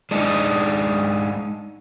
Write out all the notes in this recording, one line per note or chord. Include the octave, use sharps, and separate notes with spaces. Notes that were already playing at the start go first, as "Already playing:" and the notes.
G#3 D4 D#4